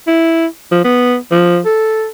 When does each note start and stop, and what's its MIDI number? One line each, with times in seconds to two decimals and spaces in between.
0.07 0.47 64
0.72 0.82 53
0.84 1.16 59
1.32 1.59 53
1.65 2.07 69